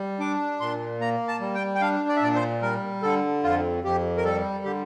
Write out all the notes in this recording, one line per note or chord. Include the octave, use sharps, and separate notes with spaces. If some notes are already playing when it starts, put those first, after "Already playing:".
Already playing: G3
D4 D6
A#2 C6
A#3 A#5
A5
G3
G5
G5
D4 F5
D5
E5
A#2 D5
C5
G3 A#4
D3 A4
F2 F4
F2 G4
A#4
G3 A4
D3 G4